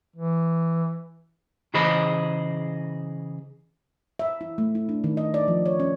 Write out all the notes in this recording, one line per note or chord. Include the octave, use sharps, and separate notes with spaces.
E3
C#3 E3 G#4 C5 D#5 B5
E5
E4
A3
E4
D4
D#3
D#5
D5
F3
C#5
C#4